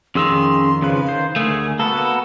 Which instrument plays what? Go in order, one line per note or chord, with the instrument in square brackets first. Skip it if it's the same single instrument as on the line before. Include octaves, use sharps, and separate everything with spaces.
[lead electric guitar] F2 D#3 [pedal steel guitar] C#4 G#4 E6 [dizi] C6
[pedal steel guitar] C#3 F3 B4 [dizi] F5
[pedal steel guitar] D#3 C5
[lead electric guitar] D2 A3 [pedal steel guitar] G#4 [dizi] A#4
[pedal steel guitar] A#3 B3 F#4 [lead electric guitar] A4 [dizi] B5